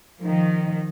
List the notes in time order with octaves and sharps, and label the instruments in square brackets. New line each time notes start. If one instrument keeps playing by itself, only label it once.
[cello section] D#3 F3